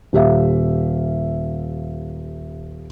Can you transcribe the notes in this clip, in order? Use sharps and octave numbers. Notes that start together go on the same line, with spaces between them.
D#1 G4 E5 F5